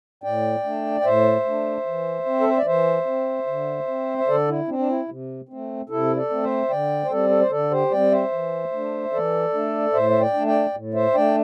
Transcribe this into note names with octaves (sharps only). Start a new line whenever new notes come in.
A2 D5 G5
A3 D4
G5
A2 C5 E5
A3 D4
E3
C4
A4
C5
D5
E3 C5 E5
C4
D3
C4
E5
D3 A4 D5
E4
C4 D4
D4
E4
C3
A3 C4
C3 E4 A4
A4 D5
A3 C4
C5 E5
D3 D5 G5
C5
G3 C4 A4 D5
A4
C5
D3 A4 D5
G4 C5
G3 C4 D5 G5
C5 E5
E3
A3 D4
E3 A4 D5
A3 D4
A2 C5 E5
E5
D5 G5
A3 D4
D5 G5
A2
C5 E5
A3 D4 D5 G5